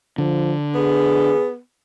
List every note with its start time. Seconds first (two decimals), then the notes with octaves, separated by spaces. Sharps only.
0.18 D3 F3
0.75 B3 G#4